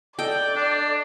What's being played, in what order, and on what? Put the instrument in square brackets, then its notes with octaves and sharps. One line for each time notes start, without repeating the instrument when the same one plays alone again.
[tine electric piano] A4 D#5 [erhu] D5 [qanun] G5
[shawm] D4